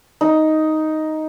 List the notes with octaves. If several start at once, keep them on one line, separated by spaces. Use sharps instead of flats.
D#4